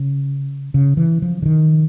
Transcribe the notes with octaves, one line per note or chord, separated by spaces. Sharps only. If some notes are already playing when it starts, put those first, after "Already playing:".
Already playing: C#3
C#3
E3
F3
D3
D#3